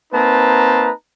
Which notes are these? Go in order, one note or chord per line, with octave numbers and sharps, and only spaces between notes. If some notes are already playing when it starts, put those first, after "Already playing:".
A#3 C4 D#4 B4 A5 A#5